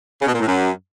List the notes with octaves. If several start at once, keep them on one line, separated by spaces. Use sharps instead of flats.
C#3
B2
A#2
A2
F#2